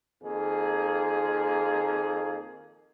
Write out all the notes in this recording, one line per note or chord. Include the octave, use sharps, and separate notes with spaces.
F2 D#3 A#3 G#4